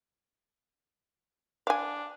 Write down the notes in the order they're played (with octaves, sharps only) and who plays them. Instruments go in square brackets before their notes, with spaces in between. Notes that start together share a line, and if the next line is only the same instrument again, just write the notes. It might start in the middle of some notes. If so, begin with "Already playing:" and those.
[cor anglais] D4 [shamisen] F5 G#5